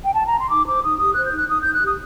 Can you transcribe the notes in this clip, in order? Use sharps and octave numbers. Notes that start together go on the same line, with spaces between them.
G5
A5
A#5
C6
D#4 D6
C5 D6
D#4 D#6
G4 D#6
C5 F#6
G6
D#4 F#6
D#4 D#6
D#4 G6
F#6
G4 D#6